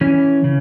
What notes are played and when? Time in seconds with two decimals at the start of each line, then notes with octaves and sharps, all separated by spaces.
0.01 E3 C#4
0.44 C#3